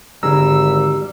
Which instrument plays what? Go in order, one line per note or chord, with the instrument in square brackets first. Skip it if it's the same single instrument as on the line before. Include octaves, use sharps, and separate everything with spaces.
[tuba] G#1 [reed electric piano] D3 G#4 A#5 [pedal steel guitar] G3 [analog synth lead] E6